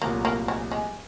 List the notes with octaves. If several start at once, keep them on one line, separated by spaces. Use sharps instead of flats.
C2 A#2 F#3 A3 A#3
A#3
G#3
G#3